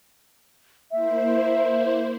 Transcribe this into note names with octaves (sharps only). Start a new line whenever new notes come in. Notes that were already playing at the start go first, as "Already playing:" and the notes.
A#3 E4 C5 E5